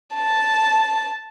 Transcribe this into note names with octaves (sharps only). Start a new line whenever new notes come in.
A5